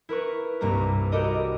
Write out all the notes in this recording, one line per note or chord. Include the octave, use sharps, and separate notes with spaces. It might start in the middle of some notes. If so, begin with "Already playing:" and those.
E4 A#4 B4 C#6
C2 G2 A#3 E4 A#5
F#4 G4 A4 A#4 D5 D#5